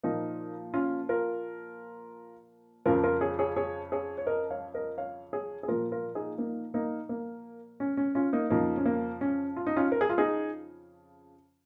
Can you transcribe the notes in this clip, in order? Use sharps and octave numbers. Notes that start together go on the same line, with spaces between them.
A#2 F3 A#3 D#4
C#4 F4
F4 A#4
F2 C#3 F3 F4 A#4
F4 A#4
G#4 C#5
G#4 C#5
G#4 C#5
G#4 C#5
C#5
A#4 D#5
C#5 F5
A#4 D#5
C#5 F5
G#4 C#5
G#4
A#2 F3 F4 A#4
F4 A#4
D#4 G#4
A#3 D#4
A#3 D#4
A#3
C#4
C#4
C#4 F4
A#3 D#4
F2 C#3 F3 A#3 D#4
C#4
A#3
C#4
F4
D#4
C#4 F4
A#4
G#4
F4
D#4 G#4